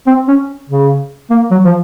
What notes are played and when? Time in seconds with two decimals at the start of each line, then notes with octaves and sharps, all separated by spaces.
0.07 C4
0.28 C#4
0.69 C#3
1.30 A#3
1.51 F#3
1.65 F3